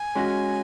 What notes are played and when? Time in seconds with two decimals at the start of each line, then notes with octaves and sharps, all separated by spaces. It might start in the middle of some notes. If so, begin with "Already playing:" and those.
Already playing: G#5
0.15 G#3 C#4 F#4